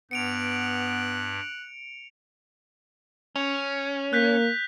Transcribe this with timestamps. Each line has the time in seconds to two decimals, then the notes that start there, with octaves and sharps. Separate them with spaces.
0.11 G2 B3 F#6 C#7 D7 F7
3.36 C#4 F7
4.13 A#3 F#6 G6 B6